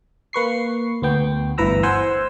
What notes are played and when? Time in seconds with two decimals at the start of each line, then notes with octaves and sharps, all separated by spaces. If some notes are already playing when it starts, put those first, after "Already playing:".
0.33 A#3 B4 C#6 C7
1.02 D2 B3 G5
1.58 G1 D2 E3 B4 A#5 E6
1.83 C5 F#5 G#5 C6 E6